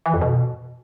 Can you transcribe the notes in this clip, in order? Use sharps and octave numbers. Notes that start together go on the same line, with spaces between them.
E3
F2
B2